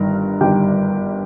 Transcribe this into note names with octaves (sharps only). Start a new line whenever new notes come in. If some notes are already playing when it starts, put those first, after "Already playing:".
Already playing: G1 G2 D#3 A#4 A#5
G1 G2 D#3 G4 G5